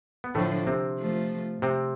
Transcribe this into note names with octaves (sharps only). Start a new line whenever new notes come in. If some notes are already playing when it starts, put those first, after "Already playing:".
B3
A2 D3 F3 A3
C3 C4
F3 A3
C3 C4